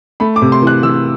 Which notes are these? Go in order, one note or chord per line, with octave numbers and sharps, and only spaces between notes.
A3 B5
D6
C3
C6
E3
F#6
E3 E6